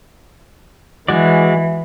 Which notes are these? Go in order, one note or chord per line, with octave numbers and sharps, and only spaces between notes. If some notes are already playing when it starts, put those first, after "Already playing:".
E3 G#3 F#4 D5